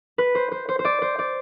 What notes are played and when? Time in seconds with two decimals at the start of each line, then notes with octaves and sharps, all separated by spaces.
0.18 B4
0.35 C5
0.51 C5
0.69 C5
0.79 C5
0.85 D5
1.02 C5
1.19 D5